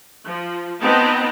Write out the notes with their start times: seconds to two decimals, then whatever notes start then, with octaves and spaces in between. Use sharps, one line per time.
0.24 F3
0.82 B3 C4 D#4 D#5 G5 A5